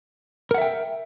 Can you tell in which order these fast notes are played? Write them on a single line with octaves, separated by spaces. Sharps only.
A#4 F#5 E5 G5